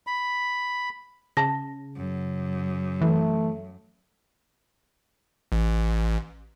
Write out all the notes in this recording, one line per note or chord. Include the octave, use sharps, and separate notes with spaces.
B5
C#3 A5 A#6
F#2
E3 A3
A1